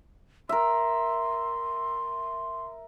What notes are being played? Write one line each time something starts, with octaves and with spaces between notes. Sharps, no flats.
A#4 E5 C6